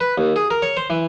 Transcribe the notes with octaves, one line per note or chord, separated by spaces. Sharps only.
B4
D#2
G#4
A#4
C#5
C5
E3